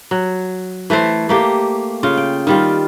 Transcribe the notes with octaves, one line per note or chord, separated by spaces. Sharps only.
F#3
E3 A3 A4 C5
A3 A#3 G4
C#3 F4
G5
D#3 G3 F4